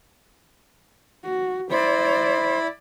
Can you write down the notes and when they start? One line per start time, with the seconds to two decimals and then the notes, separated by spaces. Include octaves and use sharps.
1.23 F#4
1.71 E4 C5 D5 B5